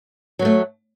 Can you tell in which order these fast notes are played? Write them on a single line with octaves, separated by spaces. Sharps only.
F#3 A#3 A3